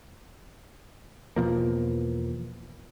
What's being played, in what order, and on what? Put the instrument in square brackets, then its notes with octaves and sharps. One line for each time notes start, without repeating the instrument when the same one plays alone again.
[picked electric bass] E2 B2 F3 A#3